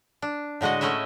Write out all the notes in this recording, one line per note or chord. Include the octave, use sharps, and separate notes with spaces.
D4
A2 D3 G#3 F#4 D#5
A3 C#4 E4 D#5 E5